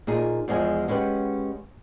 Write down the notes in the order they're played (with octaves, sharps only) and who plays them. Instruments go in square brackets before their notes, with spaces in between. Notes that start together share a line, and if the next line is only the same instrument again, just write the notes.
[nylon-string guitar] A#2 D#4 G#4
E2 F3 G#3 G#5
G#3 C#4 G4 B4 F#5